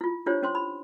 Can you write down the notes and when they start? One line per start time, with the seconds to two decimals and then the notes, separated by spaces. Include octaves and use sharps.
0.01 E4 F4
0.26 D4 E4 F4 G4 C5 C#5
0.42 C#4 C5 C6
0.55 B5